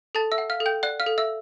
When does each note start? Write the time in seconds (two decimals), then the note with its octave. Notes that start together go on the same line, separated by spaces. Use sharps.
0.15 A4 A5 A6
0.32 E5 E6
0.38 F#5
0.50 F5 F6
0.60 A4
0.66 G5 G6
0.83 D5 F#5 F#6
1.00 F5 F6
1.06 A4
1.18 E5 E6